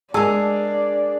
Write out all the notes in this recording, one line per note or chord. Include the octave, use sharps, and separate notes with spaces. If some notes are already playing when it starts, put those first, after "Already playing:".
G#3 D4 G#4 A#4 A5 E6